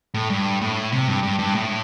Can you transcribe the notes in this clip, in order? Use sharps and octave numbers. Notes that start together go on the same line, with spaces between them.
A2
G2
A2
C3
G2
G2
G2
A2